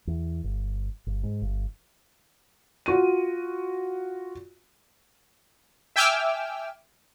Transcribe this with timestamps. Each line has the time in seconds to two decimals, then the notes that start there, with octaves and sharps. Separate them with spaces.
0.07 E2
0.44 G1
1.07 G1
1.23 G#2
1.42 G1
2.86 F4 F#4 D#7
5.96 E5 G5 G#5 D6 E6 F6